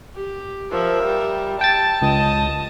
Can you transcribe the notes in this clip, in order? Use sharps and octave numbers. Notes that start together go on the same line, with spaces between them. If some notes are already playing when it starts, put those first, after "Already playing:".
G4
F3 A#4 E5
G3
G5 A5 A6
C#2 D#5 D#6